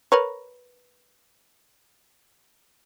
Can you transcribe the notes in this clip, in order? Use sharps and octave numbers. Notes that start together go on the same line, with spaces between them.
A#4 B4 C#5